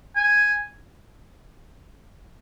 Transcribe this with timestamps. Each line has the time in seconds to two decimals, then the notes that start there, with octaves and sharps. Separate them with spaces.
0.16 G#5